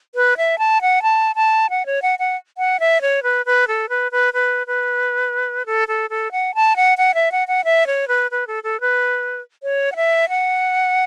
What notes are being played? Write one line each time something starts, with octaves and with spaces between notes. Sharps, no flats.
B4
E5
A5
F#5
A5
A5
F#5
C#5
F#5
F#5
F#5
E5
C#5
B4
B4
A4
B4
B4
B4
B4
A4
A4
A4
F#5
A5
F#5
F#5
E5
F#5
F#5
E5
C#5
B4
B4
A4
A4
B4
C#5
F#5
E5
F#5